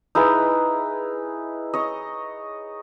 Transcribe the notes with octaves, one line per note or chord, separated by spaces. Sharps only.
D#4 E4 G#4 B4
C#5 D#5